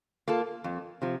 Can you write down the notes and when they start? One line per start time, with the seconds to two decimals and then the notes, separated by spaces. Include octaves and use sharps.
0.28 A#3 F4 A4
0.64 F2
1.02 C3 F3